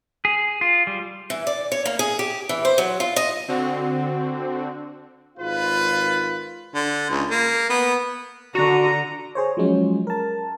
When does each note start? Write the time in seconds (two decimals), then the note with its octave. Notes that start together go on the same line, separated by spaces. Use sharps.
0.25 G#4
0.61 F4
0.87 G3
1.30 E3
1.47 D5
1.72 C#5
1.86 A#3
1.99 G#4
2.19 G4
2.49 E3
2.65 C5
2.78 F#3
3.00 F4
3.16 D#5
3.48 D3 C4 F#4
5.38 G#1 F4 B4
6.75 D3
7.10 C#2
7.30 A#3
7.70 B3
8.55 D3 F#4 A#5
9.35 G#4 C5 C#5
9.57 F3 F#3 G#3 C#4
10.07 A#4 A5